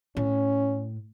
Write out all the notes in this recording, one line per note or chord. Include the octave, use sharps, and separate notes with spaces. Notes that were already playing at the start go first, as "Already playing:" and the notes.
A2 C#4